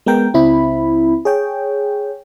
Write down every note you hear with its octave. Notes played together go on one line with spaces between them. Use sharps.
G#3 B3 A#4 G5
C#2 C4 E4 B5
G#4 C#5 G5